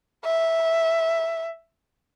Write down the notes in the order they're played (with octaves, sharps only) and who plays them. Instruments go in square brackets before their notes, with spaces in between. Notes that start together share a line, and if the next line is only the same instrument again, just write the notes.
[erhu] E5